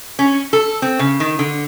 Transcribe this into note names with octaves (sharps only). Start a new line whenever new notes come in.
C#4
A4
C4
C#3
D#3
D3